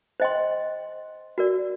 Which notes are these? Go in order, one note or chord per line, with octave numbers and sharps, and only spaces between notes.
C5 D#5 G5 C6
F#4 A#4 D5